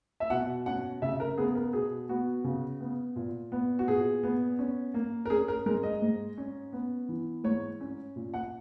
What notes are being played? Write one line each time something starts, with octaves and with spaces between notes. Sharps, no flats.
E5
B2 F#5
C#4 F#5
C#3 E5
A#4
B3 G#4
A#4
B2 G#4
B3 F#4
C#3
B3
A#2
B3
F#4
A#2 G#4
B3
C#4
A#3
A#4
C#4 G#4
A#4
G#3 A#4
D#5
G#2
C#4
B3
E3
G#2 C#5
C#4
A#2
F#5